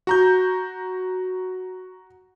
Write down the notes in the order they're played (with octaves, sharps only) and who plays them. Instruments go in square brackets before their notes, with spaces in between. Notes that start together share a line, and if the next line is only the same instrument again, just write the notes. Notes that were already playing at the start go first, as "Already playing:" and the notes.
[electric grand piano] F#4 A#5 G6